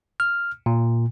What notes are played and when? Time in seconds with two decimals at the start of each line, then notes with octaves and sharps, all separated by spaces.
0.20 F6
0.66 A#2